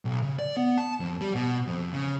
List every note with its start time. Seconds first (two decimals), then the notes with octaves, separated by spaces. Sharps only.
0.05 B1
0.22 C#3
0.39 D5
0.57 B3
0.78 A5
1.00 F2
1.21 G3
1.35 B2
1.67 F2
1.93 C#3